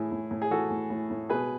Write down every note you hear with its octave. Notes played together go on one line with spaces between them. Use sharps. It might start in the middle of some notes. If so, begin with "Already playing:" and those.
Already playing: A2 E3 E4 G#4
A2
A2
G#4
E3 F#4 A4
A2
A2
A2
B2 G#4 B4